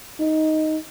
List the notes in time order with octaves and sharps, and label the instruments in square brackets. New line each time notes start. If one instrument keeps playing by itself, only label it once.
[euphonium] D#4